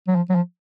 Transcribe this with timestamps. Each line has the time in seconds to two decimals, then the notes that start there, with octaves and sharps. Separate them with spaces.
0.08 F#3
0.16 F3
0.29 F#3
0.35 F3